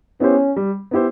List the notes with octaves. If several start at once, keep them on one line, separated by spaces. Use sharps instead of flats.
B3 C#4 E4 G4 C5
G3
B3 E4 G4 C5